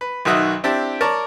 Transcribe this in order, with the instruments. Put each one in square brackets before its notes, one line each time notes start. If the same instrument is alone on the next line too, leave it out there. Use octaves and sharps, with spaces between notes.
[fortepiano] B4
B1 D#3 F#4 D#5 E5 F#5
C4 D4 E4 G4 A5
A#4 C#5 D5 A5